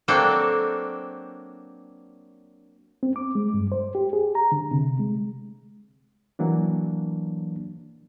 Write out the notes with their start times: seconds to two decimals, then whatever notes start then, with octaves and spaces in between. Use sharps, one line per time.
0.08 F#3 A#3 C4 D4 A4
3.03 C4
3.16 D6
3.35 G#3
3.54 G2
3.72 C5
3.95 G4
4.13 G#4
4.35 A#5
4.52 D3
4.71 C3
4.99 G#3
6.39 E3 F#3 A#3 D4